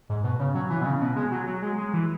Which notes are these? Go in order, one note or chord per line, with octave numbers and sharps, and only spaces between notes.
G#2
B2
C#3
F#3
E3
B2
C#3
B2
G#3
F#3
F#3
G#3
G#3
E3